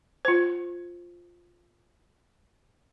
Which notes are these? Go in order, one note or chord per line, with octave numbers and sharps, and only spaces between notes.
F4 C5